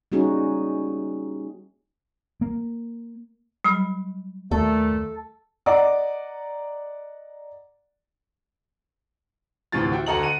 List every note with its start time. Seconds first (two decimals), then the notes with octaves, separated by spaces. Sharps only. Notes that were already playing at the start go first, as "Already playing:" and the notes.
0.12 G3 A#3 C#4 D#4 F#4 G#4
2.41 A#3
3.64 F#3 G3 B5
4.51 D#2 A#2 A3 A4
5.66 D5 D#5 F#5 A#5 D6
9.72 D2 A2 C3 E3 F4 A6
9.92 F#4 E5 G5
10.06 D2 F#4 A4 D#5 A#5 F#7
10.23 F#5 D#7